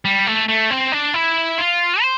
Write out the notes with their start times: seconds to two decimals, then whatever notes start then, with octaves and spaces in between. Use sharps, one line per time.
0.05 G3
0.27 A3
0.49 A3
0.71 C4
0.92 D4
1.14 E4
1.58 F4
2.02 C5